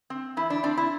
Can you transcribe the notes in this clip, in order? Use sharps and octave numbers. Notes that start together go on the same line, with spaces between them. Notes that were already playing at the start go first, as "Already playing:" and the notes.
C4
E3 E4
D4
C4 D4
E4